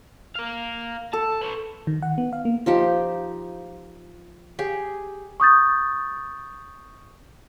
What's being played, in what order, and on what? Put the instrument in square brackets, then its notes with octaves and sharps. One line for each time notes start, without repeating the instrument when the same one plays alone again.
[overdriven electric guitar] A#4 F5
[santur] A4 [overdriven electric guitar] A5
[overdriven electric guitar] B4 C#5
[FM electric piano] D#3
F#5
B3
F5
A#3
[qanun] F3 D#4 G4
G4 G#4
[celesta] C#6 D#6 G6 A6